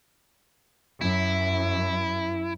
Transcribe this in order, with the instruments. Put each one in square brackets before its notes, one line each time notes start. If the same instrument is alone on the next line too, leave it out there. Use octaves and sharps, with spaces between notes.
[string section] F#2 [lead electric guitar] E4